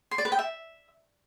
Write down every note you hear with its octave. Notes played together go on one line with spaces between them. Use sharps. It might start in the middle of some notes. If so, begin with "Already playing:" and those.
C6
D5
B4
G5
E5